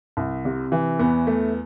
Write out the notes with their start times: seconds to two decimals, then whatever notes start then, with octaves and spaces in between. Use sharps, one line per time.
0.17 C2
0.45 C3
0.72 E3
0.99 E2 B3
1.27 A3